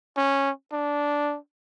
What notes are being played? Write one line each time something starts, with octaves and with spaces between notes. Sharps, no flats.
C#4
D4